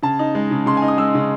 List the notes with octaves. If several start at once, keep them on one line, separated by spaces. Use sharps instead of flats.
C#3 A5
D#4
G#3
C#3
C#3 C6
G#5
D#4
D#6
G#3 E6
C#3